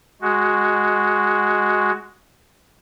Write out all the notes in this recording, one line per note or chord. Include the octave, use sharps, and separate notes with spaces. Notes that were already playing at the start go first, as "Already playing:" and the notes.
G#3 F#4